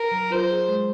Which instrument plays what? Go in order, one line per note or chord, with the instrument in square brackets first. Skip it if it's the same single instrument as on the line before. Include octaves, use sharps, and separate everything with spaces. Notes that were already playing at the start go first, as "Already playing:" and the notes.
Already playing: [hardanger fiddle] A#4
[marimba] F#3
[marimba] F4 [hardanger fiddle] C5
[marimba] G#4
G#3